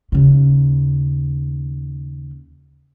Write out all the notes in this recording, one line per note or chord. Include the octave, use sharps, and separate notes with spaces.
D#2 C#3